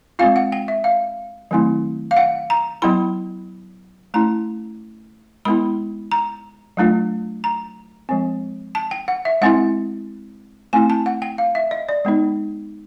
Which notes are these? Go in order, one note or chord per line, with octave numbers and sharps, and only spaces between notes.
G#3 C4 F4 F5
F#5
G5
E5
F5
D#3 F#3 A3 C4 E4
F5
F#5
A#5
F#3 B3 E4 B5
A3 C#4 E4 A#5
G#3 B3 E4 B5
A#5
F#3 A3 D4 F4
A#5
F3 G#3 C4
A5
G5
F#5
E5
G#3 C4 E4 F#5
A3 C4 E4 G#5
A5
F#5
G5
F5
E5
D#5
D5
G#3 B3 D#4